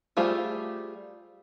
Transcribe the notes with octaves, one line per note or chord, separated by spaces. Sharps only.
G3 A3 F4 G#4 C5